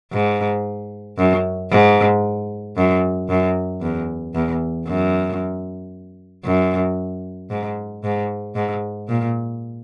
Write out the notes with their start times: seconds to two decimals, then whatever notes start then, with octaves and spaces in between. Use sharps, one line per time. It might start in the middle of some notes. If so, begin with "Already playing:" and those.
0.13 G#2
1.18 F#2
1.71 G#2
2.77 F#2
3.29 F#2
3.82 E2
4.35 E2
4.87 F#2
6.45 F#2
7.50 G#2
8.04 G#2
8.55 G#2
9.08 A#2